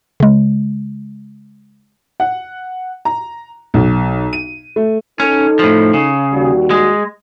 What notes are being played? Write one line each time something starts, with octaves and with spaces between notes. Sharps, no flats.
C#3 G#3
F#5
A#5
B1
D#7
A3
C#4 D#4 A4
A2 F3
C#3
D#2 G3 F#4
G#3